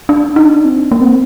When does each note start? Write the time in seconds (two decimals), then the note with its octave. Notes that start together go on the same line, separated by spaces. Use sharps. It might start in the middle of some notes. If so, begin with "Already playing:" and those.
0.09 D4
0.36 D#4
0.46 D4
0.65 C4
0.92 A#3
1.01 C4